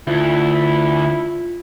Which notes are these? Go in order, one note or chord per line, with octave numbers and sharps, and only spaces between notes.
D2 E4 F4